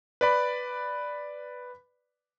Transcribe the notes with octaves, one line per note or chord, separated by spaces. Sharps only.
B4 D5 B5